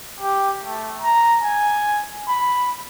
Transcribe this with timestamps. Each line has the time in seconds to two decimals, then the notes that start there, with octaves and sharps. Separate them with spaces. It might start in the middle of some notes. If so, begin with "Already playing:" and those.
0.20 G4
0.64 A3
1.01 A#5
1.42 G#5
2.28 B5